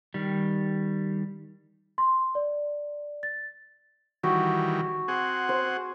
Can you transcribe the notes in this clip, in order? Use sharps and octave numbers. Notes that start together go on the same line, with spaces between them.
D#3 G3
C6
D5
A6
D#3 E3 G3 F#4
C4 G#4 F#5
C5